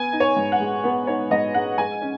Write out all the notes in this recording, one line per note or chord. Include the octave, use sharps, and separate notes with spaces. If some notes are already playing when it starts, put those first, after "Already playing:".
Already playing: B3 G#5
D#4
C#5
G#2
F#5
G#3
B3
D#4 C#5
G#2 D#5
G#3 F#5
G#3 G#5
C#4